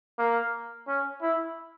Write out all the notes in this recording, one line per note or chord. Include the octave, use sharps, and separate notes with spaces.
A#3
C#4
E4